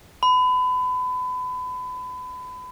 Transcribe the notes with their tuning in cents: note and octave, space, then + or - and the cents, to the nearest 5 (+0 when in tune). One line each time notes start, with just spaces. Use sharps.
B5 +30